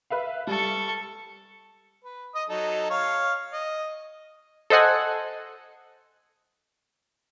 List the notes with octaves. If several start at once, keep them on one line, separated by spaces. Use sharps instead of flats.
B4 E5 F5
G3 A4 C#6
B4
D#5 D#6
F#3 D#4 A4
C#5 F5
D#5
A4 C5 D#5 F#5 G#5